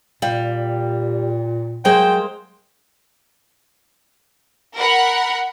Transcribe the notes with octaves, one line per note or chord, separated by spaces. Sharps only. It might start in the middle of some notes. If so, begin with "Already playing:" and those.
A#2 G3 F5
F#3 G#3 A#3 G#4 C5 G5
A#4 F#5 B5